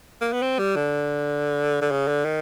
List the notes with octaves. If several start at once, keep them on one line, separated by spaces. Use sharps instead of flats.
A#3
B3
C4
G3
D3
D3
C#3
D3
D#3